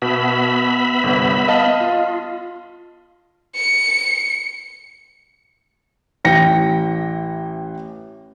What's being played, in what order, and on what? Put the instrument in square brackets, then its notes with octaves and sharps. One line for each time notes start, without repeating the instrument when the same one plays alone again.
[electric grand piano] B2 [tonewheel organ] B3 E5 B5
[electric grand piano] G1 C2
D#5 F5 A5
[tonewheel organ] F4
[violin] C#7
[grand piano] A1 E3 G5 A#6 C#7